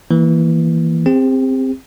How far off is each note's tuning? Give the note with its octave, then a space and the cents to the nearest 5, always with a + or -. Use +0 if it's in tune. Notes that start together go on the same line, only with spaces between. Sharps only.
E3 +0 A#3 +0
C4 +0 G4 +45